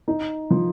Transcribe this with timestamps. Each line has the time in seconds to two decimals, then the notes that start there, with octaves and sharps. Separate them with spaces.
0.08 D#4
0.50 F3